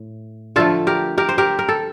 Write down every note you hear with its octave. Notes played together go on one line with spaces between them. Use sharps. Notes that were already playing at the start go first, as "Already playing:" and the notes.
Already playing: A2
D3 F3 A3 F4 A4
G4 A#4
G4 A#4
C5
G4 A#4
A#4
A4